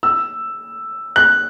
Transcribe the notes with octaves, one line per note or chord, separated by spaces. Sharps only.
E6
F#6